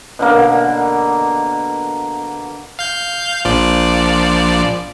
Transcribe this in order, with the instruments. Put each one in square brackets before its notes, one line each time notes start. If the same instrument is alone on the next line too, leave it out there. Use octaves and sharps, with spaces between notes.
[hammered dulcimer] B2 D3 A#3
[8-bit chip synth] F5 G6
A#1 F3 D5